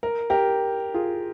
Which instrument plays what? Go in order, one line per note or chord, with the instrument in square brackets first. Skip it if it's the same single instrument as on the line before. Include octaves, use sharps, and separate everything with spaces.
[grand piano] A#4
G4 A#4
F4 G#4